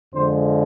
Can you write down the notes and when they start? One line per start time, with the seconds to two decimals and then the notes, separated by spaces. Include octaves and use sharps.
0.14 F2 D3 F3 G#3 C5